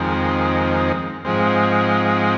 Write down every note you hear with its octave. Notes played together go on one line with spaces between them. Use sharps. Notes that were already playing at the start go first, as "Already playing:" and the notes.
Already playing: F2 D#3 G#3 C4
G#2 F3 G#3 C4